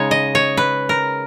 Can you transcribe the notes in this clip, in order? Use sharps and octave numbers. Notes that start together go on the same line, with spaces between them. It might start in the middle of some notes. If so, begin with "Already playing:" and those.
Already playing: C#3 G#3 D#4 C#5
D#5
C#5
B4
A#4